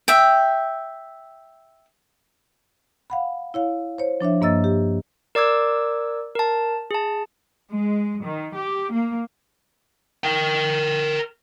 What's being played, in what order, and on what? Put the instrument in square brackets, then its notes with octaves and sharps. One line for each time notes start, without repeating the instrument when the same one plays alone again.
[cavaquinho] E5 G5
[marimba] F5 F#5 B5
E4 C#5 F5
C5 C#5
F3 D4 C#5 E5
G2 A#3 D#5 E6 A6
G4
[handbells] A#4 D5 D6 E6 G#6
A#4 A5
G#4 A5
[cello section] G#3
D#3
G4
A#3
[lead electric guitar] A#4 G5